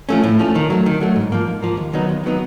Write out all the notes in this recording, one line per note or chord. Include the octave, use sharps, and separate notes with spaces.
F3 A3 C#4
A2
F3 A3 C#4
D#3
F#3 A3
D#3
F#3 A3
G#2
F3 A#3
G#2
F3 A#3
D#2
D#3 F#3 B3 D#4
D#2
D#3 F#3 B3 D#4